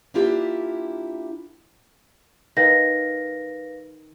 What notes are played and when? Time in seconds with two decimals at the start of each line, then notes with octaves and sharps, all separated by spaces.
0.14 A#3 D4 E4 F4 G4
2.57 D#3 B4 F5 A#6